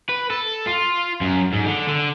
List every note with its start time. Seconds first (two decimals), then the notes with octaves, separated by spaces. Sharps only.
0.09 B4
0.30 A4
0.67 F4
1.21 F#2
1.52 G#2
1.66 D3
1.88 D3